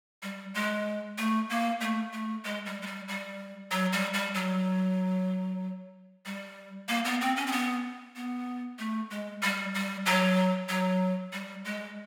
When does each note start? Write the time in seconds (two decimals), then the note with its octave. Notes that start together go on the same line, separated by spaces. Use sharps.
0.23 G3
0.54 G#3
1.18 A3
1.50 A#3
1.81 A3
2.12 A3
2.45 G#3
2.66 G3
2.82 G#3
2.87 G3
3.08 G3
3.71 F#3
3.93 G3
4.14 G3
4.34 F#3
6.26 G3
6.89 A#3
7.05 B3
7.21 C4
7.36 C#4
7.47 C4
7.52 B3
8.16 B3
8.79 A3
9.10 G#3
9.43 G3
9.75 G3
10.06 F#3
10.69 F#3
11.33 G3
11.65 G#3